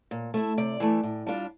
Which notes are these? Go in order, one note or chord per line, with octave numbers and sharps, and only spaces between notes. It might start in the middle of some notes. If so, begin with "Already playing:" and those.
A#2
A3 E4
C3 D5
E3 A3
A2
G3 D4 F4